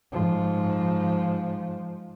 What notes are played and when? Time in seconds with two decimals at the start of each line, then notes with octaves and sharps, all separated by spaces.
0.13 G#2 F3